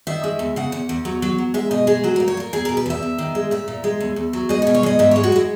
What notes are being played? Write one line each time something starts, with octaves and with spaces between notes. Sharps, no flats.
D#3 E5
G#3
E2
C#3 F#5
E2
E2
F#3
F#3
F#3
G#3 E5
B2 D#5
G#3 G#4
F#3 F#4
A#2 A#4
C#5
A#2 A#4
E2 G#4
B2 A#4
B4
E2 E5
E2
D#3
G#3
A#2 E5
A#2
G#3
E2
E2
F#3
G#3 D#5
C#5
B2
C#5
G#3 D#5
G#2 E5
G#3 C#5
F#4
G#3 E4